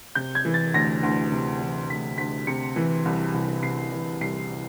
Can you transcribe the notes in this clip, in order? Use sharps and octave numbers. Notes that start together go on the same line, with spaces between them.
C3 G6
G#6
E3
A6
D2 A#6
D2
C3
E3
D2 B6
D2 B6
C3 C#7
E3
C2
C2
C3 C7
E3
C2 C7